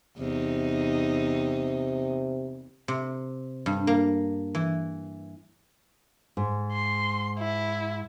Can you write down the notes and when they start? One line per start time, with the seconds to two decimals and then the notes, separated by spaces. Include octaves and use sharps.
0.18 E2 C3 D#4
2.88 C3
3.66 G2
3.87 A#3
4.55 E3
6.37 G#2
6.72 C6
7.39 E4